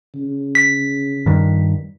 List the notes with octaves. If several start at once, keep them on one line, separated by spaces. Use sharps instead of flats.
C#3
B6
G2 D#3